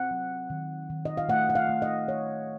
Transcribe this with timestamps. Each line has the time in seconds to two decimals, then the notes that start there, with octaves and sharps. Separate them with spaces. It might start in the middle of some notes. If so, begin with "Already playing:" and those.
Already playing: C4 F#5
0.11 F#3
0.50 D#3
0.90 D#3
1.05 D#5
1.17 F5
1.29 A3 F#5
1.49 F#5
1.55 F5
1.69 A3
1.82 D#5
2.08 D#3 C#5